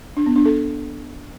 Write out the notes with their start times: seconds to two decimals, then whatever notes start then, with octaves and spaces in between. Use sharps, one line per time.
0.17 D4
0.26 B3
0.36 D4
0.45 A4